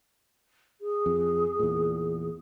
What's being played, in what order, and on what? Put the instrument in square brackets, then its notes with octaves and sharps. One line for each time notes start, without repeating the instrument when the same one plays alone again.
[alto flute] G#4
[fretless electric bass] F2
E2 A#2